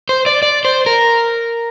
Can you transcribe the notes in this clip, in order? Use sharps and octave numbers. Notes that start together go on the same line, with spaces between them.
C5
D5
D5
C5
A#4